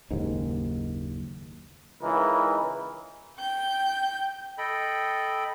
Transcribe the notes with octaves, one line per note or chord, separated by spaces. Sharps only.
F#1 D#2 G#2
C#2 E3 D#4 A#4
G5 G6
A4 D#5 G5 B5